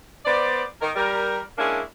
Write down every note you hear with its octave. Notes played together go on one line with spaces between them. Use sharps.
B3 C5 D5
D#3 A#4
G3 A#4
G#3 A#3 C#4 D4 E4